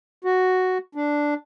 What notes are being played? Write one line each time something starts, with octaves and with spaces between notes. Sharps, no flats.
F#4
D4